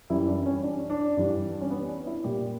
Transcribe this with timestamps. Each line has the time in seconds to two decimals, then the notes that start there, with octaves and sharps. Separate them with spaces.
0.10 F#2 E3 G3 E4
0.27 D4
0.46 C#4
0.63 D4
0.90 D4
1.17 G2 E3 G3
1.61 C#4
1.70 B3
1.88 D4
2.06 E4
2.24 A#2 G3 G4